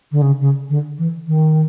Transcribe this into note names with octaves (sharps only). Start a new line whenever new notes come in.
D3
C#3
C#3
D3
E3
D#3